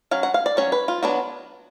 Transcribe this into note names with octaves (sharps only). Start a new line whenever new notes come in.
F#3 C#4 F5
F#5
F5
D5
F#3 C#4 C#5
B4
F4
F#3 B3 D4 F#4